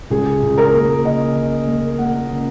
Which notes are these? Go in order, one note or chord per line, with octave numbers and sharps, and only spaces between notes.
C#2 G#4
C#2
A#4
A#3
C#3 D#5
C#3
A#3
A#3 F#5
C#3